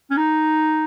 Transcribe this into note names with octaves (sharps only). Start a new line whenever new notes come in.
C#4
D#4